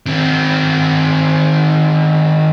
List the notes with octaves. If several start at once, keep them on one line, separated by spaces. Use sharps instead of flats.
D#3 C4